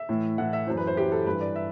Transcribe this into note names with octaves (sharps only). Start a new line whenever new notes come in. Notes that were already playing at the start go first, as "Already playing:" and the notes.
Already playing: E5
A2 E3
A2 E3 F#5
E5
F#2 E3 C5
B4
C5
F#2 E3 G4
A4
G2 E3 B4
D5
E5